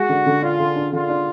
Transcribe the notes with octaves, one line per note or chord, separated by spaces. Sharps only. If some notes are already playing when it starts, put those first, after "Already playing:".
Already playing: G#3 F#4
D3
D3
D4 F4
D3
D4
D3 F4
D4